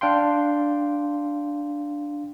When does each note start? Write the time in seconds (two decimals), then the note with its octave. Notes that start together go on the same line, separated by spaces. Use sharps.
0.01 D4 F5 G5 C6